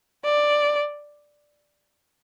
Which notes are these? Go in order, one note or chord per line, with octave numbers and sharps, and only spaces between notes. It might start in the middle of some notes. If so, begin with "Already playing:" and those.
D5